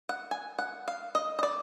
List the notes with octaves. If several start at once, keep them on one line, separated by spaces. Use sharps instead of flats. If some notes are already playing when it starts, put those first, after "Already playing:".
F#5
G#5
F#5
F5
D#5
D#5
D5